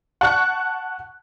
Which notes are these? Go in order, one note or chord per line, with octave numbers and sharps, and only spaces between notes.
F#5 A5 C#6 F#6